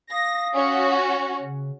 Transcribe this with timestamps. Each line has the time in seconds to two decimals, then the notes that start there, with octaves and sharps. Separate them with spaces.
0.11 F5 D#6 A#6
0.54 C#4 F#4
0.92 C#6
1.42 C#3